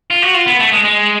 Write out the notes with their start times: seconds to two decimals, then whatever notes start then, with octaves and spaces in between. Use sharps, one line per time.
0.10 F4
0.22 F#4
0.34 F4
0.46 B3
0.59 A3
0.72 G#3
0.84 G#3